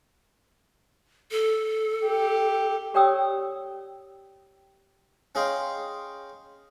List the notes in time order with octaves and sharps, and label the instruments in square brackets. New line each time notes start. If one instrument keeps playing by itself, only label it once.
[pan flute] A4
[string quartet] G4
[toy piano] G4 C#5 D5 G5 D#6 E6
[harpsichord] C#4 G#4 D#5 F5 G5 C6